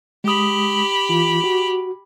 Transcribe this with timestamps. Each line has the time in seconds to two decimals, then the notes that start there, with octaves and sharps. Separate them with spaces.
0.24 G#3 G4 B5 D#6
1.09 E3 F4
1.44 F#4